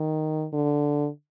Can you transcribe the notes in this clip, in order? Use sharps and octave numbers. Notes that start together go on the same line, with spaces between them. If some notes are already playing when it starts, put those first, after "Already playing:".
Already playing: D#3
D3